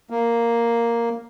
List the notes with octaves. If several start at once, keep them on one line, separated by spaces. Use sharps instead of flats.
A#3